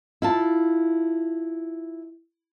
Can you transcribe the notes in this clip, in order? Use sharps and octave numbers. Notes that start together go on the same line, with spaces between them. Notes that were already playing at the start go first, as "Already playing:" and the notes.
E4 F4 A5